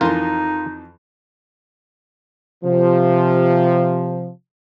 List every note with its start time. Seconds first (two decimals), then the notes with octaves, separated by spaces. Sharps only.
0.01 F2 E3 D#4 F4 A#4 C6
2.64 C3 F3